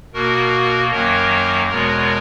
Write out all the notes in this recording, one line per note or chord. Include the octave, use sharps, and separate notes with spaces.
B2 A#3 F#4 A#4
F#2 D#3 F#3 A#3 A#4 C#5
E2 B2 G#3 B3 A#4 C#5